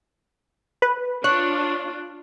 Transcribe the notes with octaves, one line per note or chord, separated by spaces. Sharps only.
B4
D4 F4 C#5 F#6